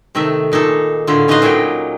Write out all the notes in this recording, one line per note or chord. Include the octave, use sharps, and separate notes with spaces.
C3 D#3 A3 D#4 E5
A#2 D#4 G#4 A4
A2 D3 E4 F4
C#4 D#4 F4 B4 D#5 F5
A#2 F#3 G#4 D#5 G5